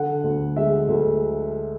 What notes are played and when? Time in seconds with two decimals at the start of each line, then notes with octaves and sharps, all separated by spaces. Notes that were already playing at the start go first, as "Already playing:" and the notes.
Already playing: D3 F#5
0.24 D2
0.56 G#3 E5
0.88 D2